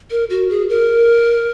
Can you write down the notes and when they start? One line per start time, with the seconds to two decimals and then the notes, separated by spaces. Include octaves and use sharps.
0.11 A#4
0.30 F#4
0.50 G#4
0.70 A#4